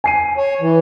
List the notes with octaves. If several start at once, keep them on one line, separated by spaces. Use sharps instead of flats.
G#5 C7 D#7
C#5
E3